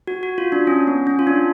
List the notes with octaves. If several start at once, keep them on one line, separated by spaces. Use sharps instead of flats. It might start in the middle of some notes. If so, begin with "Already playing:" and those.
F#4
F#4
F4
D4
C#4
B3
C#4
F4
D4